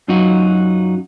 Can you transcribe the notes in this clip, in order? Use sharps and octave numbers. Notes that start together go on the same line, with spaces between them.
F#2 F#3 D#4 F4 F#4